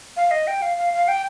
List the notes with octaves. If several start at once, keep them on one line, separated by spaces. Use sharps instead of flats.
F5
D#5
G5
F5
F5
F5
G5